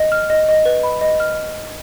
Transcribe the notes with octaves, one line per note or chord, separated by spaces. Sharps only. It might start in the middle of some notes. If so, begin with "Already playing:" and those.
Already playing: D#5
F6
D#5
D#5
B4
B5
D#5
F6